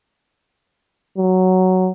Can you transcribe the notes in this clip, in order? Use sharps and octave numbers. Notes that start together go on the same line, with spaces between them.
F#3